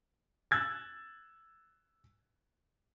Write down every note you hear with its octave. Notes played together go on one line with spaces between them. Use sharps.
E6 F#6 G#6 A6